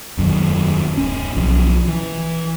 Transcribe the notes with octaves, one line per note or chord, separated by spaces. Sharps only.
E1 F#2 A2 D#3
D1 C#4
B1 F3
E3